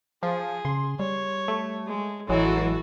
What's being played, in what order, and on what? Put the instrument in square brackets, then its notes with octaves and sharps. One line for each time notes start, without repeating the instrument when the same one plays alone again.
[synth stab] F3 [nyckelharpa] G#4
[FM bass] C#3 [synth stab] C6
[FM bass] G3 [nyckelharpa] C#5
[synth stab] A3
[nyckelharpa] G#3
[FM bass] A1 [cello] E3 [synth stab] F#3 G#3 [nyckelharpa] F#4 A4